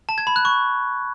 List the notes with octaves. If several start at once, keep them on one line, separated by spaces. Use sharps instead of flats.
A5
G#6
B5
F#6
C#6